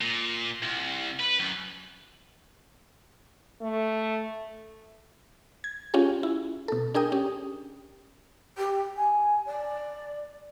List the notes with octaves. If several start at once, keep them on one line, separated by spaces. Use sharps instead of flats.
A#2
C2
B4
F#2
A3
G#6
C#4 F4 G4 G#4
E4
B2 A4
D4 G#4 A#4 G5 D#6
C#4 G4
G4
G#5
D5